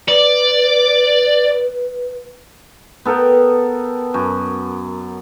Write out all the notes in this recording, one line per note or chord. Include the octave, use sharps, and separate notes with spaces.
B4 D5
B3 A4 A#4 G5
F#2